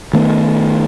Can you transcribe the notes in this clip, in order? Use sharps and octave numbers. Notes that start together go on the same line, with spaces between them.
D#3 A3 B3